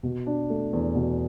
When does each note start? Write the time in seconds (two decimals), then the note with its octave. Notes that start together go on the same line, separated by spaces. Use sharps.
0.03 B2
0.27 D4
0.50 A3
0.73 E2
0.95 B2